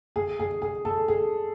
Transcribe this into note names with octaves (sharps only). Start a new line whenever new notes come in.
G#4
G#4
G#4
A4
G#4